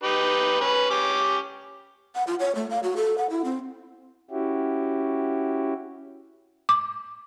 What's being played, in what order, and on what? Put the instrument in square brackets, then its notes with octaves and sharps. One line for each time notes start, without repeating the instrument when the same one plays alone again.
[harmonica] D#4 G4 B4
C#4 B4
C#4 G4 D6
[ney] F#5
F4
C#5
A3
F5
F#4
A4
F#5
E4
C4
[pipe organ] C#4 E4 F#4 G4
[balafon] D6